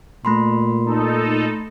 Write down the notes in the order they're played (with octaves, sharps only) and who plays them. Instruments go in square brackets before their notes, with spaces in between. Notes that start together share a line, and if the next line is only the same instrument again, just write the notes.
[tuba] A#2 [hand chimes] A3 B5 C6
[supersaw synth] D#4 A4